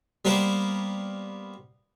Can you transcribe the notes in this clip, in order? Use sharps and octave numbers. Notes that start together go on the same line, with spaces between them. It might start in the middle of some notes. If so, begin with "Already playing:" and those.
G3 A#3 B3 A#4 C5